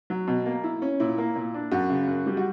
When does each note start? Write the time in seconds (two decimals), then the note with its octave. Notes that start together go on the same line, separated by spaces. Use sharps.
0.10 F#3
0.27 B2
0.46 A#3
0.64 E4
0.82 C#4
1.00 A#2 E4
1.18 A#3
1.36 A#2
1.54 D4
1.71 F#2 F#4
1.90 C#3
2.07 F#2
2.26 G3
2.37 F#4